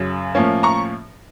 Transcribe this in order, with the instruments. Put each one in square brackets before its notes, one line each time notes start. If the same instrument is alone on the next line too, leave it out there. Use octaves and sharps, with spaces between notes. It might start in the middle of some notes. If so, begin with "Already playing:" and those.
Already playing: [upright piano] F#2 C#3 F#3
A2 F3 A#3 C#4
A#5 C#6